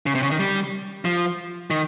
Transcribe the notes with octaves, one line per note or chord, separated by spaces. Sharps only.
C#3
C3
C#3
D#3
G3
F3
D#3